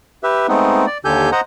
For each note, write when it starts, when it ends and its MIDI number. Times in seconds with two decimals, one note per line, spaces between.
0.23 0.47 67
0.23 0.47 71
0.23 0.47 76
0.49 0.86 56
0.49 0.86 57
0.49 0.86 59
0.49 0.86 60
0.49 0.86 63
0.87 0.98 74
1.05 1.30 39
1.05 1.30 50
1.05 1.30 67
1.05 1.30 69
1.05 1.30 80
1.05 1.30 91
1.32 1.41 72
1.32 1.41 75
1.32 1.41 78
1.32 1.41 82